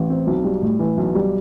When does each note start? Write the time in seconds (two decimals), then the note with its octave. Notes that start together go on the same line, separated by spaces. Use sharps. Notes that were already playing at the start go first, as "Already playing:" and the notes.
Already playing: A1
0.10 C4
0.27 B1
0.44 G3
0.62 A2
0.79 E3
0.98 B1
1.15 G3